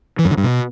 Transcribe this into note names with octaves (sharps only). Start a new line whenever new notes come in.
E3
F#2
D3
G2
B2